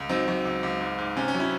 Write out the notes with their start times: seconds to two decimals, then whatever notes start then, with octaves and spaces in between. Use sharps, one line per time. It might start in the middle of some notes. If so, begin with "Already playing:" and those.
Already playing: C#2
0.09 F#3 C4 D#4
0.28 F#3
0.45 C#2
0.63 C#2
0.81 G#2
0.98 G#2
1.16 C3 C#4
1.28 C#4
1.35 F#3
1.40 C#4 E4